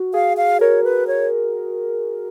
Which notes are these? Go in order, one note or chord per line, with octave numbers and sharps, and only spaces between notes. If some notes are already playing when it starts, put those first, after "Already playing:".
Already playing: F#4
G#4 F5
F5
A#4 C#5
B4
C#5